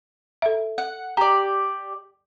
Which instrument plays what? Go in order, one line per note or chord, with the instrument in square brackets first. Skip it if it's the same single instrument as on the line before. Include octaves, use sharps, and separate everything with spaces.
[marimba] A4 E5
[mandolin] F#5
[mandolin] G4 D5 [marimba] A#5